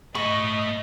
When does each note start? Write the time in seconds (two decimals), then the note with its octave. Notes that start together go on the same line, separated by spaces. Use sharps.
0.15 A3 D#5 B5 C#6